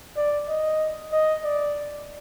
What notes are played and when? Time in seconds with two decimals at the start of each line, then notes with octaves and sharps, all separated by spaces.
0.16 D5
0.48 D#5
1.13 D#5
1.44 D5